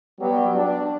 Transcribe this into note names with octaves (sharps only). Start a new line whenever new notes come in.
F#3 G3 B3 G4
D4